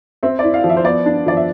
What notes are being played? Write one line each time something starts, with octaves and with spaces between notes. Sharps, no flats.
C4 E5
E4 D5
F5
F3
E5
C5
B3 D5
D4
F3 D5
E5